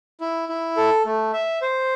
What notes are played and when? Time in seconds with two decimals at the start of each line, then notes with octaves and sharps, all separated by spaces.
0.21 E4
0.49 E4
0.77 A4
1.06 A3
1.33 E5
1.62 C5